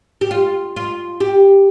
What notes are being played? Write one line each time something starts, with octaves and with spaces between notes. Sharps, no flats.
G4
F4
F4
G4